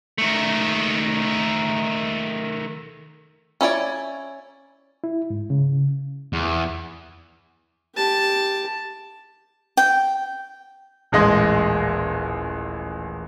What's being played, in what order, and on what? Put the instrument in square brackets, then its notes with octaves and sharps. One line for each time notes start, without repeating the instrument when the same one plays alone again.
[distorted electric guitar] D#3 A3
[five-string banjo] C#4 E4 C#5 D5
[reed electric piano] E4
G#2
C#3
[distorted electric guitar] E2
[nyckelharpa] G4 A5
[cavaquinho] G5
[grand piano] D#1 A1 G#3 D#5 C6